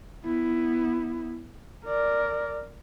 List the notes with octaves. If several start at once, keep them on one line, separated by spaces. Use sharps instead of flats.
B3 E4
A#4 D5